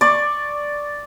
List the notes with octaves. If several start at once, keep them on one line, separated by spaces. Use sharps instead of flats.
D5 C#6